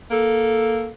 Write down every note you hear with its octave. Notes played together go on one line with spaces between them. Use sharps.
A#3 A4